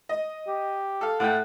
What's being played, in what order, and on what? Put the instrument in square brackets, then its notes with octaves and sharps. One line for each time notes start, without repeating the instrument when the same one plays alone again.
[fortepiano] D#5
[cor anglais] G4
[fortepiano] A4 F5
[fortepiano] A2 A3 G5 [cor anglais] F#5